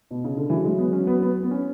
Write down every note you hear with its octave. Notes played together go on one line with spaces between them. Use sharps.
B2
C#3
D3
E3 F#3
G#3
B3
C#4
B3
B3
B3
C#4